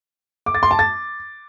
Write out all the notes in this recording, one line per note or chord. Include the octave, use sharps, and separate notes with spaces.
D6
A6
C6
A5
A6